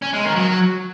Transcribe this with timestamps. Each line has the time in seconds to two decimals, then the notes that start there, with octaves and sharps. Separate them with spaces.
0.02 C#4
0.13 G#3
0.25 D#3
0.36 F#3